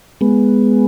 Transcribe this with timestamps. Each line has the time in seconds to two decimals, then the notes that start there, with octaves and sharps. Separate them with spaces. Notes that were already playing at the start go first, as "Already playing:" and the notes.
0.21 G#3 B3